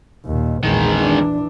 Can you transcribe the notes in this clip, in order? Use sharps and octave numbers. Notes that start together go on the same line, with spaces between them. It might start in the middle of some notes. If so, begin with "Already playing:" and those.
D#2 A#2
A#1 E2 D#3 G#3
E3 D4